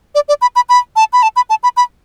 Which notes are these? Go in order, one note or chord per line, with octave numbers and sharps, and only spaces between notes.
D5
D5
B5
B5
B5
A5
B5
A5
B5
A5
B5
B5